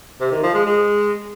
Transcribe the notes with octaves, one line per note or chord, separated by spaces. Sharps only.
C3
D#3
F3
G#3
G#3